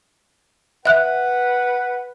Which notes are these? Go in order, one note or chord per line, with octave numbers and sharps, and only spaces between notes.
B4 E5 F#5 F#6